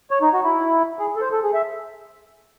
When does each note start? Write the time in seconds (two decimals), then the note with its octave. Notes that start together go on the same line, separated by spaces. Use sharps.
0.11 C#5
0.22 D#4
0.33 F#4
0.44 E4
0.99 G#4
1.16 A4
1.21 C5
1.32 A4
1.43 G#4
1.54 E5